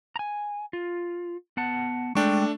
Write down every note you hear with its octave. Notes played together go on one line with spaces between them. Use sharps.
G#5 A#5
F4
B3 F#5 A5
G#3 A3 D4 G5 C#6